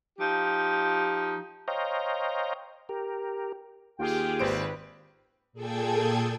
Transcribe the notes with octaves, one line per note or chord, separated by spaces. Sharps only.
F3 D#4 G4
C5 C#5 D#5 F5 G5 A#5
G4 A#4
D#2 F4 G4 G#4 G5
G#1 B4 C5 D7
A#2 G#4 A4 G5 A5 G#6